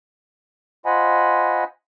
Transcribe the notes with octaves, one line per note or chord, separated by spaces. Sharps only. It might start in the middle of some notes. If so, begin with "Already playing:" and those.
F4 C5 D#5 F#5 G#5 B5